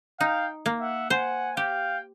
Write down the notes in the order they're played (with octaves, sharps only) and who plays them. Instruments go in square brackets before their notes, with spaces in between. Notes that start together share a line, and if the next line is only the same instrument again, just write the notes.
[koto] D#4 [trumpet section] F5 G5
[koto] A#3
[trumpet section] E5 F#5
[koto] C5 [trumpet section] F#5 G#5
[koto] G4 [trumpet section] F5 G5